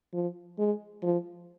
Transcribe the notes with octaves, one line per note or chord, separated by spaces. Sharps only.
F3
G#3
F3